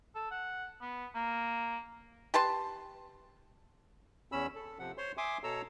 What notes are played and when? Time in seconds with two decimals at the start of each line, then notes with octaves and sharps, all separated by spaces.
0.15 A4
0.31 F#5
0.81 B3
1.15 A#3
2.34 G4 B4 A5 C6
4.32 E2 C#4 B5 E6
4.55 A4
4.79 C3 F3 F#5
4.98 C5 C#5 C6
5.17 E5 G#5 C6 D6 D#6
5.44 B2 A4 C#5 A#5 E6